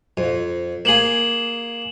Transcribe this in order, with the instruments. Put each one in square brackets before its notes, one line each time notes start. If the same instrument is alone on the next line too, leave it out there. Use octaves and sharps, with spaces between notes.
[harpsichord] F2
[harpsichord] A#3 G#4 [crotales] E7 F#7